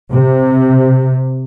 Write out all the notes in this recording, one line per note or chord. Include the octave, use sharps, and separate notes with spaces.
C3